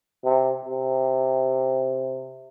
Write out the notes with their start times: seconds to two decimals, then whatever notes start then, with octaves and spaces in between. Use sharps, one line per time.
0.24 C3
0.65 C3